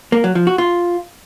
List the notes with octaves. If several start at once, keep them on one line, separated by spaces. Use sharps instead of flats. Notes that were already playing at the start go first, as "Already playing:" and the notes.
A#3
F#3
F3
F#4
F4